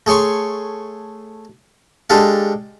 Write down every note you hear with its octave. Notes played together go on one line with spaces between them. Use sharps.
A3 G#4 C#5 C6 C#6
G#3 D4 G4 A4 F5